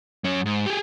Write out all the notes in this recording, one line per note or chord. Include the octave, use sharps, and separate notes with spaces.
F#2 C#4
G#2
G4 G#4